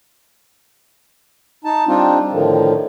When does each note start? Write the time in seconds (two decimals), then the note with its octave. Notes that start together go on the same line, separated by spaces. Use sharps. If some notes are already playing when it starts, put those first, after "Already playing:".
1.64 D#4 A5
1.88 G3 C4 D4 D#4 F4
2.32 A2 D3 D#3 F3